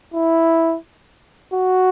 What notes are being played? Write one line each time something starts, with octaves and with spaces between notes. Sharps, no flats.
E4
F#4